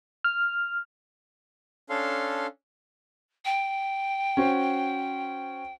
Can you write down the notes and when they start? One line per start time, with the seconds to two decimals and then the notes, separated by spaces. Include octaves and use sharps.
0.24 F6
1.90 C#4 D4 A4 F5 C6
3.45 G5
4.37 C#4 F#4 C5